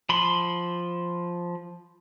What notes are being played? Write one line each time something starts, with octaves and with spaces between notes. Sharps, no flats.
F3 B5 C6